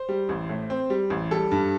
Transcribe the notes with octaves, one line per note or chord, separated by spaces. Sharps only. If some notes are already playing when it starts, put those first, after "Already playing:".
Already playing: C5
G3
A1
A2
C4
G3
A1
G3 A4
G2